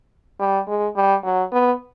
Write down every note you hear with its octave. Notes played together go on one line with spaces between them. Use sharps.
G3
G#3
G3
F#3
B3